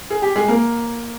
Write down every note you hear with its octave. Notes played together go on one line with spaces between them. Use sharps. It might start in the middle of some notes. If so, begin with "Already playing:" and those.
G#4
G4
G#3 G#4
A#3 A#4